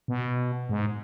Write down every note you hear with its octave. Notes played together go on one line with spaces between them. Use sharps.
B2
G#2